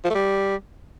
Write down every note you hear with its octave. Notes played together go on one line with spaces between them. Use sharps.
F3
A3
G3